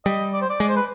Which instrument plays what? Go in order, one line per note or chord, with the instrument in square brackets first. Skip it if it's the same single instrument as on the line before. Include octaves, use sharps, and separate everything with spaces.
[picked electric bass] G3 [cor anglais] D#5
[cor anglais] D5
C5
D5
[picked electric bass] G#3 [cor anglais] D5
[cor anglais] C5
B4